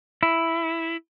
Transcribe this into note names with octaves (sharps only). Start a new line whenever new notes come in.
E4